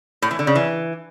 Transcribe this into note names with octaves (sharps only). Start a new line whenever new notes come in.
A2
E3
D3
C#3
E3